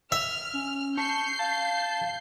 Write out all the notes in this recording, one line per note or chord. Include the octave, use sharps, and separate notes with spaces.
E5 F6
C#4
A5 C#6 G6 C7
F5 A5